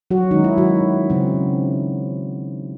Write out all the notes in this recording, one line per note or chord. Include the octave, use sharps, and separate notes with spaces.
F#3 F#4
D#3 G#3 C#4 D#4
E4
F#3 F#4
C#3 F#3 C4